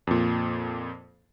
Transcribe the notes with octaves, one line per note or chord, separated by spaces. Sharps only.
F2 A#2